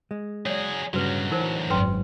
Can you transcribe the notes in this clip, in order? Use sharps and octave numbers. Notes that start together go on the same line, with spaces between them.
G#3
F#3 G#4 C#5 D5
D2 G2 C#3 F#3 F#4 B4
E3 D#4 A#4 C5
G#1 F#2 B4 G5 C6